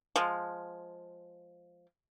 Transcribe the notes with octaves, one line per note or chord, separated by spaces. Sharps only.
F3 G#3